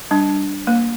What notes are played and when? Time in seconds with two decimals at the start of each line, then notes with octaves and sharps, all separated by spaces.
0.11 G3 D4
0.67 A#3